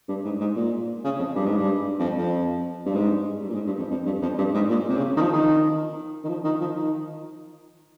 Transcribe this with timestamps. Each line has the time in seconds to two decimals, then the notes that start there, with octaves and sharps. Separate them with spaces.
0.09 G2
0.24 G#2
0.40 G#2
0.56 A#2
1.04 C#3
1.19 F2
1.36 G2
1.46 G#2
1.56 G2
1.99 F2
2.18 F2
2.86 G2
2.95 G#2
3.43 G2
3.49 A#2
3.54 G#2
3.67 G2
3.78 F2
3.91 F2
4.06 G2
4.22 F2
4.38 G2
4.54 G#2
4.70 A#2
4.89 C3
4.97 C#3
5.17 D#3
5.22 F3
5.33 D#3
6.24 D#3
6.29 F3
6.45 D#3
6.61 F3
6.76 D#3